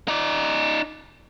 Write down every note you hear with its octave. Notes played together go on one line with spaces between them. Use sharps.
D#4 D5